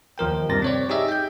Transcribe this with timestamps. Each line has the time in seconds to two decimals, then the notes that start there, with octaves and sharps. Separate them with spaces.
0.18 D#2 F3 A#4 G5
0.49 G2 C3 G3 A#4 A6 A#6
0.62 C4 C#5 D5
0.89 D#4 G4 G#4 D#5 E5
1.08 G5 G6